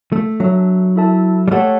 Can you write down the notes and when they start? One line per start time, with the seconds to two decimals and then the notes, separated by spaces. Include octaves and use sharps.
0.12 A3
0.40 F#3 D4 A4 E5
0.96 E4 A4 E5 A5
1.48 G3
1.51 A3 G4 C#5 F#5 A5